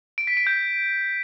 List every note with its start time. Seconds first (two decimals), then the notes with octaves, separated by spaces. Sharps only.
0.18 D7
0.27 B6
0.37 D7
0.47 G6